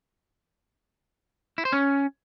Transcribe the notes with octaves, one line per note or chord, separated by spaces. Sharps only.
E4
C5
C#4